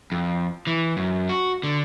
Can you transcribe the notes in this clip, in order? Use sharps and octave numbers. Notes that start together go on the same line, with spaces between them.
F2
E3
F#2
F#4
D3